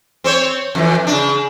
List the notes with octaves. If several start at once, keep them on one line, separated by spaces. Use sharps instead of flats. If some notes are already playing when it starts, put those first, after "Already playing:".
C4 C5 C#5
F2 E3
C#3 D4